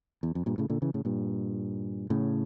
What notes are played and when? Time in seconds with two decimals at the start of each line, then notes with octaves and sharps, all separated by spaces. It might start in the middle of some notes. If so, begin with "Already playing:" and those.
0.23 E2
0.35 F2
0.46 G2 A#2
0.58 A2 C#3
0.70 A#2 D3
0.82 C#3 E3
0.94 A2 C#3
1.05 G2 A#2
2.10 A2 C#3